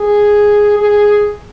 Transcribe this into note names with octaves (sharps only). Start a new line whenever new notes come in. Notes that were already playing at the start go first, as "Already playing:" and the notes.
Already playing: G#4
G#4